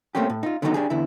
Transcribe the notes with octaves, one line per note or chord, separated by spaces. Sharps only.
A3 A#3 C4 C#4 G4
A2
D#4 F4
D3 D#3 F#3 B3 C4 D#4
D4 G4 G#4
E2 D3 E4